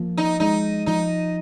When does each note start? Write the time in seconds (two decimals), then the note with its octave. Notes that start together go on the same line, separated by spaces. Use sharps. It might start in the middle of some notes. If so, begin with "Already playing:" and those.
Already playing: F3 A#3
0.18 D#4
0.40 G#3 D#4
0.86 F3 D#4